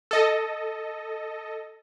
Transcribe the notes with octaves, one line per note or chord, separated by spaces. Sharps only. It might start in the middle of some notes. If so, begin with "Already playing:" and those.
A4 D#5